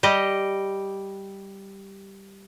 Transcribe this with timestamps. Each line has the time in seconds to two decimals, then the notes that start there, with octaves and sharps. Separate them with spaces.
0.03 G3 G4 D#5